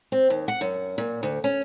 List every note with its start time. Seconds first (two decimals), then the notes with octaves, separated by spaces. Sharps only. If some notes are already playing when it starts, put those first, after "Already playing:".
0.12 C4
0.30 D#2
0.48 F#5
0.61 F#2
0.98 A#2
1.23 D2
1.44 C#4